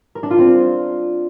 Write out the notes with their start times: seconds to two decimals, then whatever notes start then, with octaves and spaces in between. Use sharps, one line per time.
0.15 A#4
0.23 D4
0.31 F4
0.38 C4